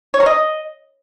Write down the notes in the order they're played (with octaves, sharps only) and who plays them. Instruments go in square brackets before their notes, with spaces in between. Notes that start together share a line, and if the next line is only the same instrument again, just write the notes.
[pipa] C#5
A#4
D#5